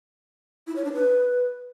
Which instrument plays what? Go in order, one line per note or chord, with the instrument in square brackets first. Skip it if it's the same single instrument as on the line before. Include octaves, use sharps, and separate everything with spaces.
[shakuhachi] E4
C#5
D4
B4